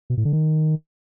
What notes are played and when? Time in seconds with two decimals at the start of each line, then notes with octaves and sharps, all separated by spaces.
0.10 B2
0.17 A2
0.25 D3
0.33 D#3